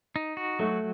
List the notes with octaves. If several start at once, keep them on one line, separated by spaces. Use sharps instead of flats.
D#4
F#4
F#3 A3